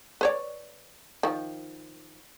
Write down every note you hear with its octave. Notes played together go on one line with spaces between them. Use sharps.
B4 C#5 D5
D#3 F3